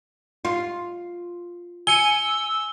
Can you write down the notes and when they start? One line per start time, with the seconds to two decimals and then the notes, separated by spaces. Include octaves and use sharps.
0.45 F4
1.87 G#5 E6 C#7 D#7 G7